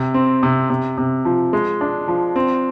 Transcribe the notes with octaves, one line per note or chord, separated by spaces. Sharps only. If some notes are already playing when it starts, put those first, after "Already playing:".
Already playing: C3
C4
C3
C3
C3
F3
G#3
D4
F3
C4